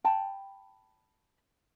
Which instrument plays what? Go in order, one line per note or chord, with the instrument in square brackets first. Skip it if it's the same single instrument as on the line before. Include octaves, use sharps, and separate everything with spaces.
[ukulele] G5 A5 B5